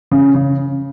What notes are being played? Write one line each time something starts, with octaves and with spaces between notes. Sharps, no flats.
C#3
C#3